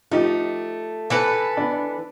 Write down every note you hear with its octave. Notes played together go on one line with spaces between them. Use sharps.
F3 A3 D#4 G4
E3 A4 B4
B3 D4